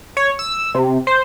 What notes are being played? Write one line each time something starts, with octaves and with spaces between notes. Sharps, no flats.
C#5
E6
C3
C5